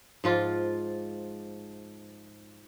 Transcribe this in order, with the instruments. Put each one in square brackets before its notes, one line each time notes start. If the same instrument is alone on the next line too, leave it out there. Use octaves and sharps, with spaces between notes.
[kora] G#2 F3 F4